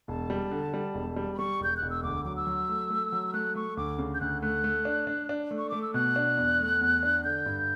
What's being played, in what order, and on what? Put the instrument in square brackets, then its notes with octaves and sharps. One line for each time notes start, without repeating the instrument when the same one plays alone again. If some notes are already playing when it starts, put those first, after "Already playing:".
[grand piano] E1 [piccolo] A5
[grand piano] G3
D3
G3
E1
G3
[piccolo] B5
[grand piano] G3 [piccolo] C#6
[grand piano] E1 [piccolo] G6
[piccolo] F#6
[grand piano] E1
[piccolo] E6
[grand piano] D2 [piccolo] D6
[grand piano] F#3 [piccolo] D6
[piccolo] E6
[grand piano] F#3
A3
A3
F#3
[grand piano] A3 [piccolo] F#6
[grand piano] A3 [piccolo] C#6
[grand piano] D2 [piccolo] D6
[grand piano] C#3
[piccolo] G6
[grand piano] D2 [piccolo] F#6
[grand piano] A3 [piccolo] F#6
[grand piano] A3
D4
D4
D4
A3
[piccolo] C#6
[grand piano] A3 [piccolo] D6
[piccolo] E6
[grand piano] B2 [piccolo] F#6
[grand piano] D4
E2
A3
E2
D4
[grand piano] D3 [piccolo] G6
[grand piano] G2